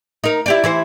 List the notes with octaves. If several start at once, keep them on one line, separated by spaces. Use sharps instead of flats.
D#4 A#4
E4 G4 D5
E3 E4 C5